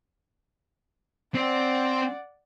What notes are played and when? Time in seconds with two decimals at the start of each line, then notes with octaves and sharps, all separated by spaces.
1.35 C4 C5 D5 F#5